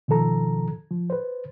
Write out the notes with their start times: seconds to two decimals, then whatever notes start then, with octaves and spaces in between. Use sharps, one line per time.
0.08 B2 D#3 F3 A4 A#5
0.91 F3
1.10 B4 C5